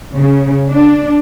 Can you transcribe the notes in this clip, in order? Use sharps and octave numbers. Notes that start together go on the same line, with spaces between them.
C#3
D4